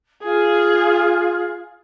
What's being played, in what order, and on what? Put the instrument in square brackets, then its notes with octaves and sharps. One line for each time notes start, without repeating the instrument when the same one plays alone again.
[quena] F4 [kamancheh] G#4